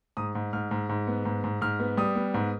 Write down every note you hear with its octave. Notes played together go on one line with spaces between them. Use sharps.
G#2 D#6
G#2
G#2 F6
G#2
G#2
B3
G#2
G#2
G#2 F6
B3
G3 D#6
B3
G#2